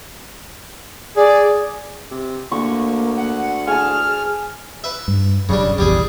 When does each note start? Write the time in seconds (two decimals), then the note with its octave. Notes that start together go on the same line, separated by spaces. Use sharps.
1.17 G#4 D5
2.11 C3
2.52 D2 A#3 C#6
3.17 F#5
3.67 G#4 G#5 A5 F6
4.84 B4 E5
5.08 G2
5.49 E1 F#2 C#3 G3 D4
5.78 F1 A#1 E2 G3 G4 G#4